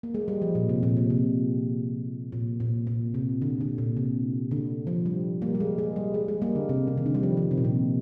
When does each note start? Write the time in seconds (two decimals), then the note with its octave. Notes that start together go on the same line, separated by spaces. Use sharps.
0.03 A#3
0.14 G#3
0.28 G3
0.42 F3
0.55 A#2
0.69 C3
0.83 A#2
0.97 A#2
1.10 C3
2.32 A#2
2.60 A#2
2.87 A#2
3.14 C3
3.42 D3
3.61 D3
3.78 A#2
3.97 C3
4.51 D3
4.87 F3
5.06 G3
5.42 G3 A#3
5.55 G3
5.60 G#3
5.78 G#3
5.96 G3
6.14 G#3
6.28 G#3
6.42 G3 A#3
6.55 D3
6.69 C3
6.87 C3
6.97 D#3
7.06 D3
7.15 G3
7.23 F3
7.37 D#3
7.51 C3
7.58 A#2
7.64 C3